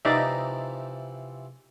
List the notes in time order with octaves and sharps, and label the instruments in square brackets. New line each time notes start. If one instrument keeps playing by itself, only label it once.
[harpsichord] C3 E3 F3 [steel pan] D#4 D5 E5